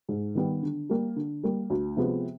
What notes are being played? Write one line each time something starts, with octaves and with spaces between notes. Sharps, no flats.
G#2
D#3 G3 B3
D3
G3 A#3
D3
G3 A#3
D2
C3 F3 G#3 B3